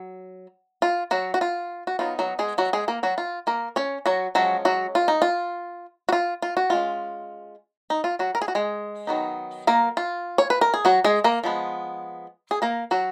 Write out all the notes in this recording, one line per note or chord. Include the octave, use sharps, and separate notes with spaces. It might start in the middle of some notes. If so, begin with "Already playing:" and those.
Already playing: F#3
F4
F#3 F#4
F#4
F4
F#4
F#3 B3 D#4 F4
F#3 F#4
G#3 G#4
F#3 F#4
G#3 G#4
A#3 A#4
F#3 F#4
F4
A#3 A#4
C#4 C#5
F#3 F#4
F3 F#3 G#3 C#4 F#4
F#3 F#4
F4
D#4
F4
F#4
F4
F4
F#4
G#3 C#4 F4
D#4
F4
F#3 F#4
A#4
G#4
F#4
G#3 G#4
D#3 F#3 B3 D#4
A#3 A#4
F4
C#5
B4
A#4
G#4
F#3 F#4
G#3 G#4
A#3 A#4
F3 G#3 B3
G#4
A#3 A#4
F#3 F#4